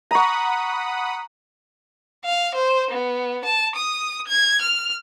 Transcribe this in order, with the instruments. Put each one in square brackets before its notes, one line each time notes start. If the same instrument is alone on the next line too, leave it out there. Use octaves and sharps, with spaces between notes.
[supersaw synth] F#5 B5 D#6 [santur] A#5 C#6
[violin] F5
C5
B3
A5
D#6
G#6
F6